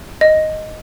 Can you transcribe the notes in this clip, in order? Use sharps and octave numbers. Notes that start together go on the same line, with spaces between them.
D#5